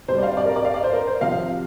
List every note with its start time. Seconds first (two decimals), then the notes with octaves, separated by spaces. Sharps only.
0.08 C3 G3 C5
0.18 D5
0.23 F5
0.37 D5
0.46 A#4
0.56 D5
0.65 F5
0.74 D5
0.84 C5
0.93 A#4
1.07 C5
1.21 C3 F3 F5